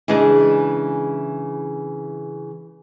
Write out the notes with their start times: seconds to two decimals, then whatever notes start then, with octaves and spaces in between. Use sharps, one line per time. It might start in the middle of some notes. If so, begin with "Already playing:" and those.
0.08 C#3 E3 G#3 D4 G#4